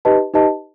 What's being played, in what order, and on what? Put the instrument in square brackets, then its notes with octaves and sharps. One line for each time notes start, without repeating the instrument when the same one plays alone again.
[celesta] D#4 G4 B4 D#5 A5
D#4 G4 B4 D#5 A5